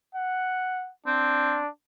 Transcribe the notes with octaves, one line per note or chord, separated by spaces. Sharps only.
F#5
C4 D4